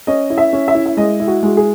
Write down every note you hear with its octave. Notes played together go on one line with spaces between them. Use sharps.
C#4 D#5
E4
E5
C#4
E5
E4
E5
G#3 D#5
E4
F#4
G#3 F#4
G#4